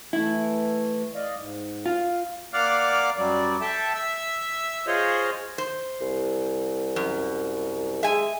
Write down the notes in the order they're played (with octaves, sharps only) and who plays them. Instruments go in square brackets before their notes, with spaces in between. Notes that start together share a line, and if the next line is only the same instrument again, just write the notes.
[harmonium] E3 A3 [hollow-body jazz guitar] E4
[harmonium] D5 D#5 F5
G#2
[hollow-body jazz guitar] F4 [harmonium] F5
[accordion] A#3 D5 F5 F#5 D6 F6
F#2 F#3 G3 D5
A4 E5 G5 A5
E5 E6
F4 G#4 C5 C#5 D#5
[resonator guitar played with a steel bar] C5
[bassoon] C2
[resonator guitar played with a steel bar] F#2
[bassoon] G#3 [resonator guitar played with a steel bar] E5 G#5